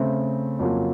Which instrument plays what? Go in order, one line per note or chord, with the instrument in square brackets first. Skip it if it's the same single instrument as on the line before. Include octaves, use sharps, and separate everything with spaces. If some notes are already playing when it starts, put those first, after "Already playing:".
Already playing: [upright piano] C#3 A3 C4
F2 C#3 F#3 A#3 F4